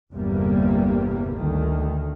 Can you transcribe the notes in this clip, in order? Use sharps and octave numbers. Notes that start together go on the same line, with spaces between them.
G1 E2 C3 G3 A#3
D2 D#3